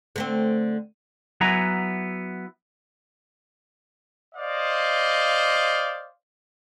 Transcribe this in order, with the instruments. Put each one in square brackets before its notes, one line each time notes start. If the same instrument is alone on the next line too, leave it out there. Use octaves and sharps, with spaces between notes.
[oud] D3 A3 C4
[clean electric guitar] F#3 B3 E4 F#5 G#5 A#5
[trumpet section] C5 D5 D#5 F5